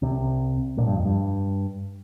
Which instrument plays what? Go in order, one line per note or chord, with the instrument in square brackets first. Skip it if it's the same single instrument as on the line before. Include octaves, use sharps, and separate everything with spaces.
[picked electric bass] C2 C3
A#1 A#2
G2
F2
G2